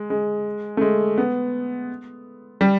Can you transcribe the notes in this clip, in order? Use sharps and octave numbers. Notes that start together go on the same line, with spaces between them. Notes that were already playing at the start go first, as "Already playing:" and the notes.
Already playing: G#3
G#3
A3
G#3
B3
G3